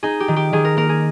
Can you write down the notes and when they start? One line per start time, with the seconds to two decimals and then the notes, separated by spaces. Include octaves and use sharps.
0.03 D#4 G#4
0.20 G4
0.28 D#3
0.36 G4
0.53 D#3 G#4
0.65 A#4
0.77 A#3 A#4
0.89 G#4